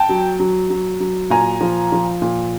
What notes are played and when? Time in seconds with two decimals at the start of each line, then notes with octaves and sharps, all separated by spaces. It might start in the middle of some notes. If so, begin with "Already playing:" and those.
Already playing: G5 A5
0.09 F#3
0.40 F#3
0.70 F#3
1.00 F#3
1.30 A#2 G#5 A#5
1.61 F3
1.92 F3
2.22 A#2